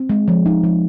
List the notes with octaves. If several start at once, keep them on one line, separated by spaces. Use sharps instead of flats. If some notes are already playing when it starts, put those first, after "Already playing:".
Already playing: C4
G#3
F3
D#4
F3